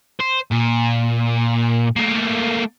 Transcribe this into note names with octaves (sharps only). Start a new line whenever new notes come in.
C5
A#2
A3 A#3